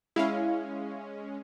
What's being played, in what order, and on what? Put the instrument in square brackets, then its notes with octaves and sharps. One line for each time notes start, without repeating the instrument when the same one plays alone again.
[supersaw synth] G#3 C#4 [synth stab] E4 F5